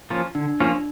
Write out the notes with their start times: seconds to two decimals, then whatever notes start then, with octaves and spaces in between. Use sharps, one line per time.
0.10 F3 A#3 C#4 F4
0.35 D3 D4
0.60 F3 A#3 C#4 F4